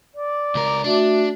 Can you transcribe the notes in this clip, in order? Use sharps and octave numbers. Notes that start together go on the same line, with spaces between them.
D5
C#2 A#4
A3 D4 F#4 E5